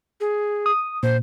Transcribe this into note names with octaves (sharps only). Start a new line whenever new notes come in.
G#4
D#6
A#2 C5